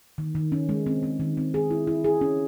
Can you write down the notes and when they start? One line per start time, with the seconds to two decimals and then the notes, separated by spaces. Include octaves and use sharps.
0.18 D#3
0.35 D#3
0.52 C#4
0.69 G#3
0.86 C4
1.03 C4
1.20 D#3
1.37 C4
1.54 G#4
1.71 E4
1.87 E4
2.04 G#4
2.21 C#4